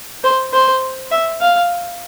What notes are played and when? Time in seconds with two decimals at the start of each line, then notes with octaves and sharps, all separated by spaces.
0.24 C5
0.53 C5
1.11 E5
1.41 F5